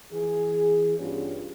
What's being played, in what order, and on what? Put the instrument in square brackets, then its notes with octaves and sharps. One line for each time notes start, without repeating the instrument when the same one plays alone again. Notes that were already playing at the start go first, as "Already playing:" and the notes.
[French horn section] E3 G#4
G2 B3 C#4 F4 G4 C#5